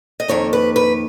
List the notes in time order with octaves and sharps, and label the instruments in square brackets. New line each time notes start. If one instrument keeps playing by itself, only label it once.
[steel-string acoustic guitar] D#5
F2 D#3 A#3 C#5
B4
B4